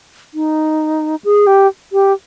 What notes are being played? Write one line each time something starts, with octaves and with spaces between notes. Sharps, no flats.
D#4
G#4
G4
G4